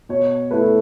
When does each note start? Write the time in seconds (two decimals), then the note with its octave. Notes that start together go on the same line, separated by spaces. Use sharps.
0.09 B2 C#5
0.51 A3 E4 B4
0.62 A4